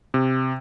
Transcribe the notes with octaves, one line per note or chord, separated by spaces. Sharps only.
C3